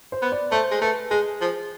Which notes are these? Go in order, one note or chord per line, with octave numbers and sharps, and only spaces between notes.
C5
B3
D5
A3 C5
G#3
A3 B4
G#3 G#4
F3